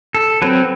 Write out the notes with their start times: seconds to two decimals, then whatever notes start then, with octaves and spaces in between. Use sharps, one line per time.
0.15 A4
0.42 F#3 C4 B4